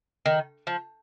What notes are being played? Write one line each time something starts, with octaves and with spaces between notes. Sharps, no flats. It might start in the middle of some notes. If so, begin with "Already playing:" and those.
D#3
F3